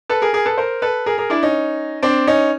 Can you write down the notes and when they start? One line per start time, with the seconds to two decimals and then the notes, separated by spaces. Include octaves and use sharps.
0.09 A4 B4
0.22 G#4 A#4
0.33 G#4 A#4
0.46 A4 B4
0.58 A#4 C5
0.82 A4 B4
1.06 G#4 A#4
1.18 G#4 A#4
1.30 D4 E4
1.43 C#4 D#4
2.03 C4 D4
2.27 C#4 D#4